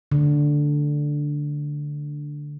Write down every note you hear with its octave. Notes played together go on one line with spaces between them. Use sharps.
D3